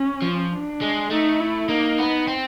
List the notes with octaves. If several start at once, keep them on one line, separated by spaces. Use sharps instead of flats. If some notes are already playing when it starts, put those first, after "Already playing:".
Already playing: C#4
F3
D4
G#3
A3 D#4
E4
A#3 D#4
B3
C4